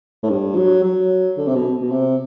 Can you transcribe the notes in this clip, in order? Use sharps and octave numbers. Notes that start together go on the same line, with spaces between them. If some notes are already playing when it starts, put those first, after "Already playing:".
A2
G2
F#3
F#3
D3
C3
B2
B2
C3